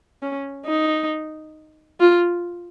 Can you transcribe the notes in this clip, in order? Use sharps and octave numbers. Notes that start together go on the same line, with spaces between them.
C#4
D#4
F4